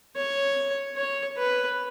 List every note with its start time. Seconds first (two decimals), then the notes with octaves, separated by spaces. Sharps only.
0.16 C#5
0.96 C#5
1.37 B4